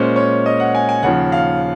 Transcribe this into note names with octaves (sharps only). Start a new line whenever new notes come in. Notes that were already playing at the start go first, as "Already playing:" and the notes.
Already playing: A#2 G#3 C#4 C5
C#5
D#5
F#5
G#5
G#5
D#2 C#3 F3 F#5
F5